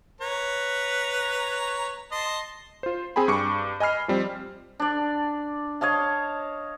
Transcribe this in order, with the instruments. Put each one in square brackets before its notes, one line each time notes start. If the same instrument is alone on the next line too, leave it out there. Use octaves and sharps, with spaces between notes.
[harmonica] B4 C#5 A#5
D#5 A5 C6
[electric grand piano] F4 C5
C4 G#4 G5 G#5 B5
G2 C#6 D6 C#7
D#5 G#5 B5 F6 C7
F3 G3 C4
[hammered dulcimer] D4 D5
C#5 D#5 F5 A5